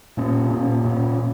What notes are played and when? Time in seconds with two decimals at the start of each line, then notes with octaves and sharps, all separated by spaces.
0.17 A#2 A#3 C#4
0.51 A#2 A#3 C#4
0.85 A#2 A#3 C#4
1.18 A#2